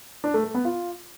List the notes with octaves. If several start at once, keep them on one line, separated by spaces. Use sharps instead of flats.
D4
A3
A3
B3
F4